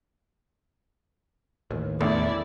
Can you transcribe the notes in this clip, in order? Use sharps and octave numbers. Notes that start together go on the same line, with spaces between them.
A1 D#2
E2 A2 D3 E4 D5